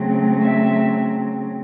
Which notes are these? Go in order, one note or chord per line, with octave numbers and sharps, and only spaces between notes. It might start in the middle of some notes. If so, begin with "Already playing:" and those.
Already playing: C#3 F#3 A3 C4
E5